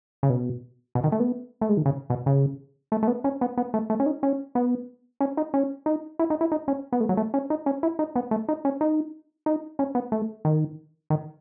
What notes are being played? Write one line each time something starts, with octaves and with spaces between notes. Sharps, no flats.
C#3
B2
B2
D#3
A3
B3
A3
G#3
D#3
C#3
B2
C#3
A3
A3
B3
C#4
B3
B3
A3
A3
C#4
D#4
C#4
B3
C#4
D#4
C#4
D#4
E4
D#4
E4
D#4
C#4
B3
A3
F#3
A3
C#4
D#4
C#4
E4
D#4
B3
A3
D#4
C#4
D#4
D#4
C#4
B3
A3
D#3
D#3